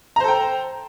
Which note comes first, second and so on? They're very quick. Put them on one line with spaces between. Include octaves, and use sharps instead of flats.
A#5 C5 A4 G5